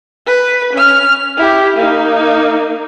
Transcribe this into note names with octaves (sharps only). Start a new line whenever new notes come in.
B4
C#4 F6
E4 G4
A#3 D#4